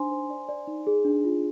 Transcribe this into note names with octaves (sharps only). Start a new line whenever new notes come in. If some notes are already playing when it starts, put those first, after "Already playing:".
Already playing: D4 D#4 C5 G#5 C6
C5
D5
D5
D#4
G#4
D4
F4